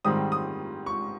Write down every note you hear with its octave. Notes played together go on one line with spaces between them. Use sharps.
G#2 D#3 G3 C4 D#6
D#6
C#6